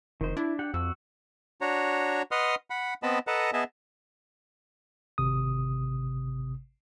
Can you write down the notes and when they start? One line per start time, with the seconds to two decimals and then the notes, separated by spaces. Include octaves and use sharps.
0.21 F1 D#3 C5
0.37 D4 E4
0.59 G4 F#5
0.74 F2 F#4 E6
1.61 D4 F#4 C#5 A#5
2.31 B4 D#5 F#5 C6 D#6 F6
2.70 F#5 B5
3.03 B3 C4 D#5 A5 B5
3.27 A4 B4 D#5 F#5 A5 A#5
3.53 B3 G#4 D#5 E5 A5
5.18 G#1 C3 D#6